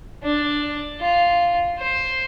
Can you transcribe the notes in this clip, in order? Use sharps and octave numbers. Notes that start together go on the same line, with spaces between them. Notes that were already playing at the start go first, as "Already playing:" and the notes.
D4
F4
C5